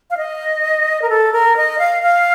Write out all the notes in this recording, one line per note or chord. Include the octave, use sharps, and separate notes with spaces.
F5
D#5
A#4
A4
A#4
D#5
F5
F5